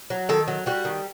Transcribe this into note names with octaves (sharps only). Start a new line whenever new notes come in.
F#3
D#3 A4
F#3
G3 F#4
D#3